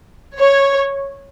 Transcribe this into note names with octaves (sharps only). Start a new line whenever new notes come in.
C#5